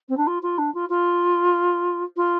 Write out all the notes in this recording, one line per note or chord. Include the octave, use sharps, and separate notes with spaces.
C4
D4
F4
F4
D4
F4
F4
F4